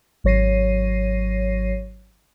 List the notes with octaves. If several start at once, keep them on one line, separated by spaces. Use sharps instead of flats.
G#1 F#3 C#5 A#6 C7 D#7